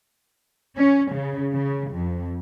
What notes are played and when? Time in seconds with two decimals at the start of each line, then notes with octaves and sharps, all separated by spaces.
0.76 C#4
1.13 C#3
1.53 C#3
1.89 F2